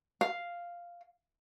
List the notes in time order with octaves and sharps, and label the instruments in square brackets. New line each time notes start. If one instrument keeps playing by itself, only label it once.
[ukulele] F5